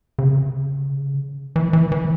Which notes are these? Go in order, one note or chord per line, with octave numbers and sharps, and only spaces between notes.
C#3
E3
E3
E3